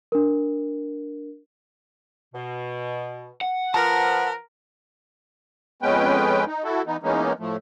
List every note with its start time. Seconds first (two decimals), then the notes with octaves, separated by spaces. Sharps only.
0.12 D4 A#4
2.34 B2
3.41 F#5
3.74 F3 A#4 B4 A5 F6
5.82 F2 G#3 B3 C#4 B4 G5
6.47 D#4
6.64 E4 F#4 A4
6.86 E3 B3 D#4
7.03 E3 G#3 A#3 B3 C#4 D#4
7.39 A2 F3 A3